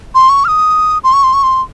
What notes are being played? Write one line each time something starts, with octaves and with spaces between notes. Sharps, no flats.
C6
C#6
F6
D#6
C6
C#6
C6
C#6
C6